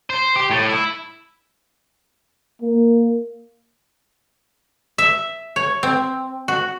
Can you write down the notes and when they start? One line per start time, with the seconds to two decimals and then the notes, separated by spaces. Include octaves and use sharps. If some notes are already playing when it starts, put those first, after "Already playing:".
0.10 C5
0.36 G4
0.51 A2
0.69 E4
2.62 A#3
4.98 E5
5.56 C#5
5.83 C4
6.48 F#4